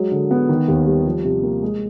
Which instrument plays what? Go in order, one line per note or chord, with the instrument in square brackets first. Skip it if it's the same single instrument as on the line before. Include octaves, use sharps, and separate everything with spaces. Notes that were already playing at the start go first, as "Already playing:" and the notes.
Already playing: [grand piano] F#3 G#3
D3
B3
D#3
D#2
G3
F3
C3
A#3
G#3